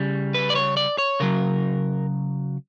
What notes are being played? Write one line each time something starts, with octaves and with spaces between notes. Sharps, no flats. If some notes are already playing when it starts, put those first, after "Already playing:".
Already playing: C#3 G3
B4
D5
C#5
D5
C#5
C#3 F#3 A#4